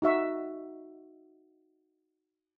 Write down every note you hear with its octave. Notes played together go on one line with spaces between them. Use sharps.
D#4 F#4 E5 C#6